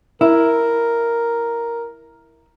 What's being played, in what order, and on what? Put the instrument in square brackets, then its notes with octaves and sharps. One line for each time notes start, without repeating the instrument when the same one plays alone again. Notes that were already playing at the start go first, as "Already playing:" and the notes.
[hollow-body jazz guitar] E4 [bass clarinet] A#4